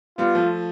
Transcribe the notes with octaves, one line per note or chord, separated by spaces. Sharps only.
G3 B3 F4
F3 A3